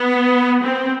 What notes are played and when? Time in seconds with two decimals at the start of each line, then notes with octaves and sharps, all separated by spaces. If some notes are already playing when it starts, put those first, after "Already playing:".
Already playing: B3
0.63 C4